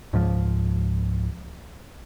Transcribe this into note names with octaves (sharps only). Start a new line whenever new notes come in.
C#2 G#2 F3